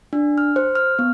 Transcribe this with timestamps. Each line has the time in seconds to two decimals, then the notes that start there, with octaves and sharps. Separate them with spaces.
0.13 D4
0.38 F6
0.56 C5
0.75 F6
0.99 B3